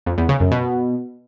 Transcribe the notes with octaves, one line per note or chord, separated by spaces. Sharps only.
F2
E2
C#3
F#2
B2